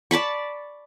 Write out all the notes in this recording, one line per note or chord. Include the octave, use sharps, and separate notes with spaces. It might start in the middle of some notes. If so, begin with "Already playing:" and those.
D5 A5 B5 C#6